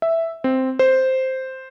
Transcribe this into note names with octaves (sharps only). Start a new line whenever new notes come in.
E5
C4
C5